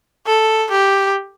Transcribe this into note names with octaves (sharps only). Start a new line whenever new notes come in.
A4
G4